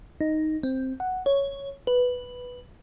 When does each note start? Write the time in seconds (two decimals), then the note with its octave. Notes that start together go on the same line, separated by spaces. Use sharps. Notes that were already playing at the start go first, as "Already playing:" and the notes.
0.21 D#4
0.63 C4
1.00 F#5
1.26 C#5
1.87 B4